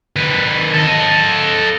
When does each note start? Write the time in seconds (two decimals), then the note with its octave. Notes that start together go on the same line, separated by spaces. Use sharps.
0.16 D#3 B4
0.74 A4 D#5